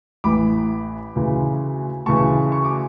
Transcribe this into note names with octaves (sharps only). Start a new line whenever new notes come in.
A1 A2 E3 B5 D6
D2 C#3 E3
D2 C#3 E3 A5 C#6
C#6
D6